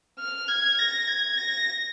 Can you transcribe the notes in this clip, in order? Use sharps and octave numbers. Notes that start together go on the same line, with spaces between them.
F6
G#6
A#6
G#6
A#6